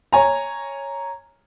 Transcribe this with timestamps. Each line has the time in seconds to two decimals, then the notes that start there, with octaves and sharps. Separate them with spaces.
0.13 C#5 G#5 A#5